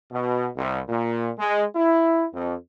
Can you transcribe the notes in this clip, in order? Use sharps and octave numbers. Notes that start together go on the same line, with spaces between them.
B2
C2
A#2
G#3
E4
F2